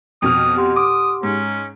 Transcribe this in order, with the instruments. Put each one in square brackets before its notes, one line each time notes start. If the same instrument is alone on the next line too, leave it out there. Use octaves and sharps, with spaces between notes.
[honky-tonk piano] F2 B2 F6 [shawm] D#6
[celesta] G4 F#5 C6
[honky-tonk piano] D6 [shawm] D#6
[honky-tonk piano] G#2 [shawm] C#4